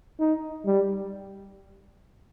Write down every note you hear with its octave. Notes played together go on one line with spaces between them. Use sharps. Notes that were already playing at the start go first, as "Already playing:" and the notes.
D#4
G3